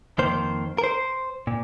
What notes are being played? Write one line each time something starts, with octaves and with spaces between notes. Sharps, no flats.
F2 D#3 A#3 C5
A#4
C5
A#2